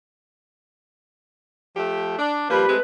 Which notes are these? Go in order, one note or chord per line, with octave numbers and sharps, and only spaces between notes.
F3 A3 G4
D4
F3 G3 A#3 G4 B4
G#3 A3 C4